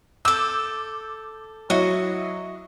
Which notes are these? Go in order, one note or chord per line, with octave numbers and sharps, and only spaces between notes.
A4 D6 E6 G6
F#3 E4 F#4 D#5